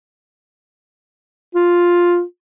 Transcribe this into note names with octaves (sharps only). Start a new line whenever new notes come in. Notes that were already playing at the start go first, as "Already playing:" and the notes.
F4